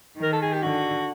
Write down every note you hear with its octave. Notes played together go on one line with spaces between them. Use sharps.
D#3
A#4
A4
G#4
G4
D3 F#4